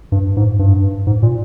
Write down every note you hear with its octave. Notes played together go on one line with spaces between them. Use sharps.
G2
G#2
G2
G#2
A#2